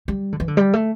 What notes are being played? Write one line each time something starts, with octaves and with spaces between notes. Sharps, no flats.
G3
D3
E3
D3
G3
A3